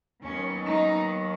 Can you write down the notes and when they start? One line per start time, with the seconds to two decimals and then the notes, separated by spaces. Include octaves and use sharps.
0.22 D#2 D#3 F#3 B3 C#4
0.66 D#4